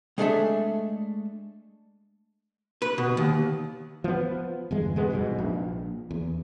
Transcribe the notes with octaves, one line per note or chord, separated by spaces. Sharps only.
G#3 A3 D4 G#4 A4 E5
B4
B2
D#2
F3 B3
G1 E2 G#3
C3 G#3 B3
C2 F2 G#2 B2
A#1
E2